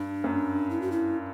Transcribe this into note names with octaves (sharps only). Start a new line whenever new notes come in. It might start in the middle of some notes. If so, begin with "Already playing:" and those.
Already playing: G2 D4
F#2
E4
F#4
E4